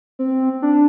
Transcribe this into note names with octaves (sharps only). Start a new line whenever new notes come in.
C4
D4